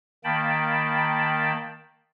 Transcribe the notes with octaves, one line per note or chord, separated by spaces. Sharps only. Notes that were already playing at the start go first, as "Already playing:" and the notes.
D#3 A#3 G5 A5 B5